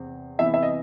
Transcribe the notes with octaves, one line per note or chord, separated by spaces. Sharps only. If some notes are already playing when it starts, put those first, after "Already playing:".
Already playing: E2 C3 C4
C3 E3 B3 E4 E5
E5
D#5